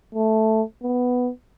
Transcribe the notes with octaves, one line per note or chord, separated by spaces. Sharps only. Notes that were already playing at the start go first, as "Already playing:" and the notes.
A3
B3